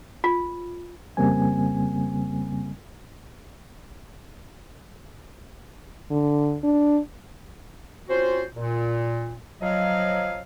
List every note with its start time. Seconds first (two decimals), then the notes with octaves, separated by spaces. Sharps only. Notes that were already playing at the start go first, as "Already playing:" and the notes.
0.24 F4
1.17 F2 C#3 G3 A#3 C4 G#5
6.11 D3
6.64 D4
8.09 C4 C#4 F4 F#4 C5
8.56 A#2
9.62 F3 F#3 D#5 F5